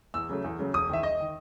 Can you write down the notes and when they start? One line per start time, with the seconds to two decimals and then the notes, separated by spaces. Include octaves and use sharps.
0.14 E2 E6
0.29 C#3 F#3 A3
0.44 E2
0.59 C#3 F#3 A3
0.74 E1 D#6
0.89 E2 D#3 E5
1.03 E1 D#5
1.20 D#3